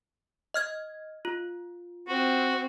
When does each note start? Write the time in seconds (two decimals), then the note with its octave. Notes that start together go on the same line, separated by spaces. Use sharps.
0.54 D#5 F6 G#6
1.25 F4
2.08 C4 F#4